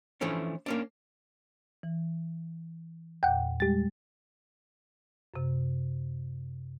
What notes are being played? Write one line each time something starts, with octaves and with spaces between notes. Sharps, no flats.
E3 F3 A3 C#4 D4
A#3 C#4 D4
E3
E2 A#2 F#5 G5
G3 G#3 G4 A6
F#2 C3